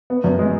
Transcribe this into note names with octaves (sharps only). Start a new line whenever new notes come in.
B3
F#2
G#3